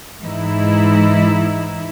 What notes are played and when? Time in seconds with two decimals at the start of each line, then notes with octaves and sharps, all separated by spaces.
0.23 G#2 E3 D#4 E4